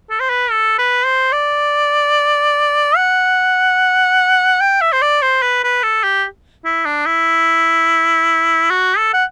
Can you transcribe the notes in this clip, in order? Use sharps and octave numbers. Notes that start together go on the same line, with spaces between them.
A4
C5
B4
A4
B4
C5
D5
F#5
G5
E5
C5
D5
C5
B4
B4
A4
G4
E4
D4
E4
F#4
A4
F#5